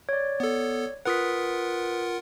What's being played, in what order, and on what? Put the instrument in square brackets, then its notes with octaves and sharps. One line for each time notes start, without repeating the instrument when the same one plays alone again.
[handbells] C#5 D5
[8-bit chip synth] B3 A4
[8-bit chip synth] F4 A#4 F#5 [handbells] B4 D#6 B6